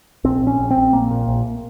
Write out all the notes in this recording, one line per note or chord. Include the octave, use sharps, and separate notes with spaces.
A#1 C4
A#1 C#4
A#1
C4
A#1
A#1 A#3
A#2
A#1